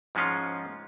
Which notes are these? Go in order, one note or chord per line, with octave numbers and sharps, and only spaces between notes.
G#2 F3 G#3 C#4 F4